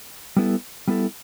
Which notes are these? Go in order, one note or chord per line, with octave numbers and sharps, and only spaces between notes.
G3 B3 E4 A4
G3 B3 E4 A4